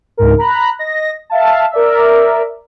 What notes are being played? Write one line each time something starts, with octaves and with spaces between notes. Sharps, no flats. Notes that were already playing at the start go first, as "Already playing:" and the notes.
C#2 G#2 A#4
A#5 B5 F#6
D#5 A#6
E5 F5 A5
A#4 D5 E5